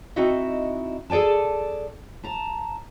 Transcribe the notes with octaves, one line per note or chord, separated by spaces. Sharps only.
C4 D#4 E4 F#4 D#5 E5
G#4 A4 D5 G#5 A5
A5 A#5